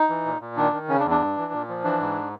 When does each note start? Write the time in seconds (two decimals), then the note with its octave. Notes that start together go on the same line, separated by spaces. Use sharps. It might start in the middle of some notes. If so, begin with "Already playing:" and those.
Already playing: D#4
0.09 E3
0.25 A#2
0.41 A#2
0.56 D#3 D4
0.72 D#3
0.88 C#3 C#4
1.00 D4
1.04 E2
1.11 D4
1.20 G2
1.37 E3
1.53 A#2
1.69 F3
1.84 E3 D4
2.00 G#2